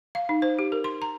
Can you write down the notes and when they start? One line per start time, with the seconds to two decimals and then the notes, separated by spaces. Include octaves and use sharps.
0.15 F5
0.29 D#4
0.42 C5
0.59 G4
0.72 A#4
0.84 C6
1.02 A#5